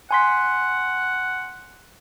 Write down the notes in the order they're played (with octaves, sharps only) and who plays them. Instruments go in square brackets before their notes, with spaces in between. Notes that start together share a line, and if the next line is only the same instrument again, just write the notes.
[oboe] F#5 [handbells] G#5 C6 B6